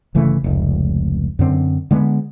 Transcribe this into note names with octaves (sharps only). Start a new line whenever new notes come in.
G1 C#3 E3 A3
F1 C#2
F#2 D3 C4
D3 G#3 A3 B3